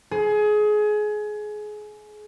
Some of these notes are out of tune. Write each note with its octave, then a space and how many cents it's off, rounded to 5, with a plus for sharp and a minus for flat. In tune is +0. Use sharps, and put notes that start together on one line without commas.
G#4 +25